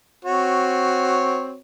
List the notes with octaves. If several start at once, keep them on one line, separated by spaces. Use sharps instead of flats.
C4 F#4 C#5